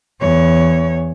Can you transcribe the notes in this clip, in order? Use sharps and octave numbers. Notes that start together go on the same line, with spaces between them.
E2 C#5